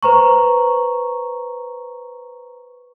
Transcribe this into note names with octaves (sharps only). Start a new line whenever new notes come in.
B4 C5 A#5 C#6